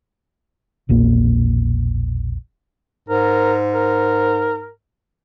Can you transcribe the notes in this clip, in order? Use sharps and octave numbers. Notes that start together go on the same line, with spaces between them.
E1 A#1 A#3
G#2 A#4
A#4